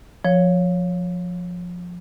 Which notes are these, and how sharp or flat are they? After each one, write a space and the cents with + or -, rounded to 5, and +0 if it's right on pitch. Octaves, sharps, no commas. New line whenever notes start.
F3 +15 C#5 +0